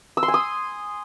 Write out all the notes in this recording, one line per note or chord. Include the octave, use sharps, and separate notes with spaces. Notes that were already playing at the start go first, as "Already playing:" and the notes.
E6
C6
G#5
D#6